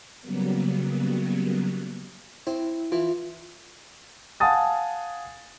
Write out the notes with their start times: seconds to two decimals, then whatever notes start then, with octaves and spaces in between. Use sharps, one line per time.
0.21 C#3 F#3 G3 A#3 B3
2.47 C4 E4
2.92 E3 F4
4.40 F5 F#5 G#5 A5 D#6 A6